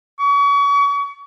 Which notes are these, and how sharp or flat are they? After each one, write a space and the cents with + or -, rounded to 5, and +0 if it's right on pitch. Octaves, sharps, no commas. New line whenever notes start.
C#6 +35